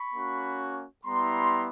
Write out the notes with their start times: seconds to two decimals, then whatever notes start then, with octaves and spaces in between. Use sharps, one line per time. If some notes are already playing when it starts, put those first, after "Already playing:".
Already playing: B5 C#6
0.14 A#3 C#4 F#4
1.04 G3 B3 E4 A#5 C6